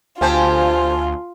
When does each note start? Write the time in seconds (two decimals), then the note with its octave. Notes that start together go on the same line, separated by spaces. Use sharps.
0.21 D2 C4 F4 G4 C5 F5 G#5 A5